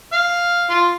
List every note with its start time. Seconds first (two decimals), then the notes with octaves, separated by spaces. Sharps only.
0.13 F5
0.70 F4